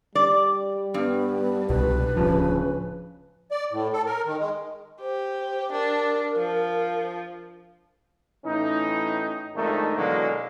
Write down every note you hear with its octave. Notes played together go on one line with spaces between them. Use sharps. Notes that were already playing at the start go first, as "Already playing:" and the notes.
G3 D5
G2 B3
C2 B2 B4
D1 C#3 F3
D5
A2
A4
A#4
D#3
G#3
G4 C5
D4 A#4
F3
A2 E3 C#4 D#4
F2 D#3 G#3 A3 D4 D#4
B2 D3 E3 F#3 G#3 A#3